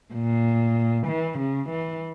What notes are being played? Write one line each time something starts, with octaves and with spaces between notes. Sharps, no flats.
A#2
E3
C#3
E3